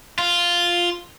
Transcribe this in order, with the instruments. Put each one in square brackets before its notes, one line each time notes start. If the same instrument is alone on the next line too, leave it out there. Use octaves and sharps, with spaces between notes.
[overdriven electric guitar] F4